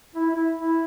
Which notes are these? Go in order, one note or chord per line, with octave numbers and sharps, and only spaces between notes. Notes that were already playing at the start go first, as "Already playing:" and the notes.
E4
E4
E4